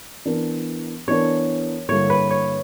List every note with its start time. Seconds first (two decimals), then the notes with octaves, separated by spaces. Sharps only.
0.25 E3 B3 D4 A#4
1.08 E3 B3 D4 A#4 C#5
1.89 G2 D3 A#3 E4 C#5
2.10 B4
2.30 C#5